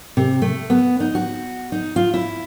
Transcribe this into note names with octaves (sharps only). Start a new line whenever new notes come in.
C3
A3
B3
D#4
F#4
D#4
F4
E4